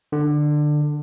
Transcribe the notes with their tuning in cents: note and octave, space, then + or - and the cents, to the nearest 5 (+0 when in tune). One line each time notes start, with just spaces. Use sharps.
D3 +20